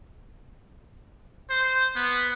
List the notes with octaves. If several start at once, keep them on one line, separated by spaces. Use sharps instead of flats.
C5
B3